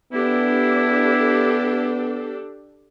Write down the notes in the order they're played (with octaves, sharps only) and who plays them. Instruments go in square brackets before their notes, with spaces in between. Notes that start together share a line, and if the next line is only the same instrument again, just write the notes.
[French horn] B3 [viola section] D4 G4 A4 [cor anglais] E4